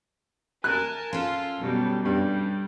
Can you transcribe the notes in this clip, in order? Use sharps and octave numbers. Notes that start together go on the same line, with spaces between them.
A#4 G#5 A5 F#6
C#4 F4 A4
B2 F#3 G3
G2 G3